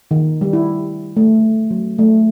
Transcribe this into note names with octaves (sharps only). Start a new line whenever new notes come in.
D#3
G3
E4
A3
F#3
A3